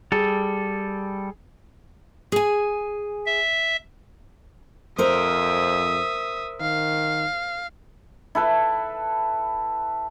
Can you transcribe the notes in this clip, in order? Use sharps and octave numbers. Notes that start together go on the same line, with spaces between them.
G3 G#4 A4
G#4 G#5
E5
F2 A#4 C5 E5 D#6
D#3 F5
E4 A4 B4